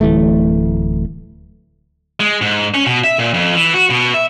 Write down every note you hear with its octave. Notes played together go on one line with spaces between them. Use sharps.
D1 E3 A3
G#3
G#2
C#4
B2
E5
A#2
F2
E3
F#4
B2
E5